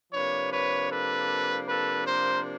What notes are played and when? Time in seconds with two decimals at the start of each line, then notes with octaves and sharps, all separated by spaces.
0.13 C3 F3 A#3 D4 B4 C#5
0.52 B4 C#5
0.91 A4 B4
1.67 A4 B4
2.06 A#4 C5